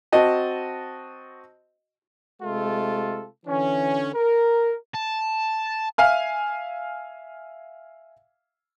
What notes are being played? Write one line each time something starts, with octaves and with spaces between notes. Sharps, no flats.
C4 F#4 D#5 A5
C3 G#3 A3 F4 A4
D3 E3 C#4
A#4
A5
E5 F5 G#5 F6